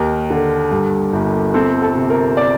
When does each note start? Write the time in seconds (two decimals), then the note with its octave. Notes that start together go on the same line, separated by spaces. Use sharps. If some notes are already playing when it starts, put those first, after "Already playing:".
Already playing: D#2 A#4
0.30 D3
0.71 G2
1.13 G1
1.54 C4 A4
1.82 A4
1.95 C3
2.10 A#4
2.37 D5